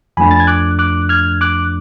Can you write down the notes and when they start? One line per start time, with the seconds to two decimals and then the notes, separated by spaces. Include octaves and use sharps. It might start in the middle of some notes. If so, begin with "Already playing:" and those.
0.17 F2 F3 A3 D4 G#5 B5
0.31 A6
0.40 G#6
0.47 D6 F#6
0.79 D6 F#6
1.09 F6 G#6
1.41 D6 F#6